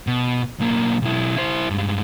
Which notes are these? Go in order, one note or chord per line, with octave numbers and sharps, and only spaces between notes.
B2
B1 A#3
B1 E4
E4 C5
G2 G#3